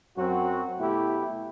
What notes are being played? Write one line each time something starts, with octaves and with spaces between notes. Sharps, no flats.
F#2 F#3 C4 F#4
B2 A3 E4 G4